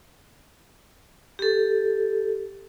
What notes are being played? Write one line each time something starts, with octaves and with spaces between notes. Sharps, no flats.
G4 A4